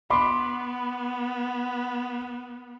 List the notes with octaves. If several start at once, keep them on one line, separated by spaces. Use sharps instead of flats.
B3 B5 C6 D6